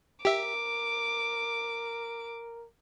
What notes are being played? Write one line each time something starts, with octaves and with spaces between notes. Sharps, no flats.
G4 A#4 E5 D6